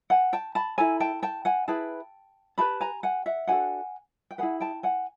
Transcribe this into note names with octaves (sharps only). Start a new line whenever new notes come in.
F#5 G#5
G5 A5
A5 B5
E4 A4 G#5 A#5
G5 A5
G5 A5
F#5 G#5
E4 G#4 B4 G5 A5
D#4 G4 B4 A5 B5
G#5 A#5
F#5 G#5
E5 F#5
D4 F#4 A4 F#5 G#5
G5
E4 G#4 B4 F#5 G#5
G5 A5
F#5 G#5